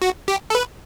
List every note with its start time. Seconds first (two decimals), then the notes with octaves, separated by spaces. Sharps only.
0.02 F#4
0.28 G4
0.50 A4
0.55 B4